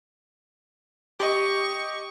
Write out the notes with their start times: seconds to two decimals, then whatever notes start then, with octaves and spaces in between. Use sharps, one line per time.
1.20 G4 D#5 C#6